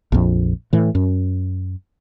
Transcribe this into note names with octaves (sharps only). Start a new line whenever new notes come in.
A#1 F2
A2 E3
F#2